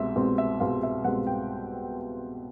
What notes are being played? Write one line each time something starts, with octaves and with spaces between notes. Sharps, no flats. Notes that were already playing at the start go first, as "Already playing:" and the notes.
Already playing: C2 B2 G#3 C4 E5
C2 B2 G#3 C4
E5
C2 B2 G#3 C4 F5
E5
C2 B2 G#3 C4 F#5
G5